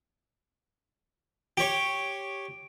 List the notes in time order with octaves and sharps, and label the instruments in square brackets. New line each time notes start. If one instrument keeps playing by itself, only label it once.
[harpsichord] G4 C#5 [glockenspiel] D7